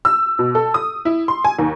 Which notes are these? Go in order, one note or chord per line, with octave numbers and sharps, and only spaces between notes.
E6
B2
A4
D#6
E4
C6
G#5
D#2